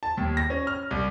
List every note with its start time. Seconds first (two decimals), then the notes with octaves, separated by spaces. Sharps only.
0.03 A5
0.17 D#2
0.37 A#6
0.50 C#4
0.67 F6
0.91 C2